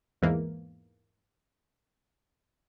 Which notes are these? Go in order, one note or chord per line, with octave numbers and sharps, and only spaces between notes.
E2 G#2 E3 A#3